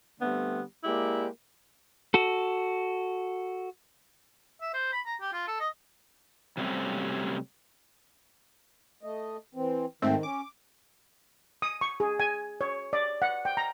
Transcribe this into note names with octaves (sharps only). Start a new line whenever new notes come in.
D3 G3 A3 B3 C4
G#3 A#3 E4 G4 D5
F#4 A4
E5
C5
B5
A#5
G4
F4
A4
D#5
C3 F#3 G3 A3 C4 C#4
A3 D#5
E3 C4
G#2 D#3 A3 C4
C#4 D6
D#6
C#6
G#4
G#5
C#5
D5
F#5
G5
A#5